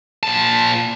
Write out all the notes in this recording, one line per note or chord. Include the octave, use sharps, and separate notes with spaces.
A#2 A5